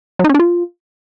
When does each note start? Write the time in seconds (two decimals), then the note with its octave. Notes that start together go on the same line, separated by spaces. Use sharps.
0.19 F#3
0.24 D#4
0.29 C#4
0.34 D4
0.39 F4